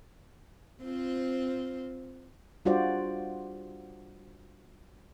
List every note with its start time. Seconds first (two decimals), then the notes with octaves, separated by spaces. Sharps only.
0.82 C4 F4 C5
2.65 G3 D4 F4 F#4 C5 D5